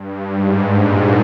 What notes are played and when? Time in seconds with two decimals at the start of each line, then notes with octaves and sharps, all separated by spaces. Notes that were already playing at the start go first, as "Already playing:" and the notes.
Already playing: G2
0.34 G#2
0.77 A#2